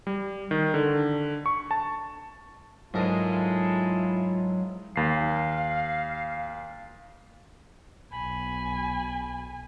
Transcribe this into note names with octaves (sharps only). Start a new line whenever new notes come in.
G3
D#3
D3
C#6
A5
G#2 F#3 G#3 E4 F4 A4 A#4
D#2 F5 C7
B1 G#5 B5